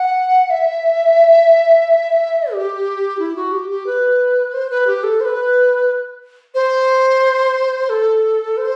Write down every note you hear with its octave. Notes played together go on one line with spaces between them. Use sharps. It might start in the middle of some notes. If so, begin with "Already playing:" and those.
Already playing: F#5
E5
G4
E4
F#4
G4
G4
B4
C5
B4
G4
A4
C5
B4
C5
A4
C5